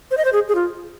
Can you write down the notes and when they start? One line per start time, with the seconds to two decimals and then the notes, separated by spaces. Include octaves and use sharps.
0.11 C5
0.17 D#5
0.25 C5
0.33 G#4
0.48 G#4
0.55 F4